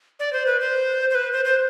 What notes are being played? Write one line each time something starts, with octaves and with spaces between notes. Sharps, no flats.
D5
C5
B4
C5
C5
B4
C5
C5